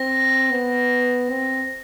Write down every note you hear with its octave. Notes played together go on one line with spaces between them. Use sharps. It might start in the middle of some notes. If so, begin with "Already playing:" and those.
Already playing: C4 A#6
B3
C4